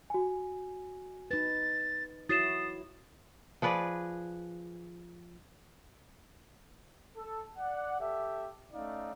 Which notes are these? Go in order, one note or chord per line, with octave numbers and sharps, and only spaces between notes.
F#4 G#5
D#4 B4 A6
E4 F#4 C#5 D#6 A6 C7 E7
F3 G#4 B4 D5
A4
D5 F#5
G4 A4 E5
A3 C#4 D#4 D5 F5